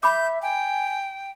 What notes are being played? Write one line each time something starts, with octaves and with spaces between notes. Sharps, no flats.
E5 B5 D6 G6
G5 G#5